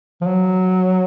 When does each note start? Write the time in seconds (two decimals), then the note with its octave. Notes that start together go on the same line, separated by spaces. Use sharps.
0.21 F3
0.26 F#3